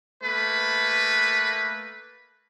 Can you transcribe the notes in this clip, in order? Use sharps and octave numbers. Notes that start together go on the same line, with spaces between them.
A3 A#3 B4